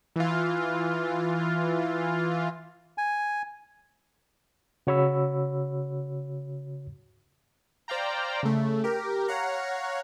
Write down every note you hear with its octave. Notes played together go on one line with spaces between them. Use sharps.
E3 F4
G#5
C#3 F#4 C#5 B5 E6
C5 D5 F5 G5 A#5
C#3 A3
G4 A#4
C#5 F5 F#5 A#5